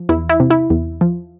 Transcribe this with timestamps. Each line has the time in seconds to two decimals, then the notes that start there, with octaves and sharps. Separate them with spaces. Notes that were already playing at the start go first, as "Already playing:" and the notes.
Already playing: F3
0.09 E2 E4
0.29 E4
0.40 C3
0.50 E4
0.70 E2
1.01 F3